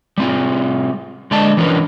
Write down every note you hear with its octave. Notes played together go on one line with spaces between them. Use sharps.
G3 C4 F4
D3 G#3 D5 D#5 A5
E3 F3 C#4 D4 A#4 B4